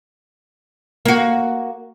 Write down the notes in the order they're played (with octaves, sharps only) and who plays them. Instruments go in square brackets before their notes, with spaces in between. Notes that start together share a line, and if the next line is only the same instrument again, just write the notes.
[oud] A#3 F#4